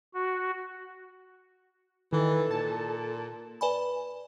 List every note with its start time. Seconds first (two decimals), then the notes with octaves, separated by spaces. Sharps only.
0.14 F#4
2.13 D#3 E3 A4
2.51 A#2 A5
3.61 B4 D5 G#5 B5